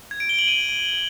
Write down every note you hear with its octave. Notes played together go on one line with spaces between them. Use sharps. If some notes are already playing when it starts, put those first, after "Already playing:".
G#6
D7
G7
F#7
D#7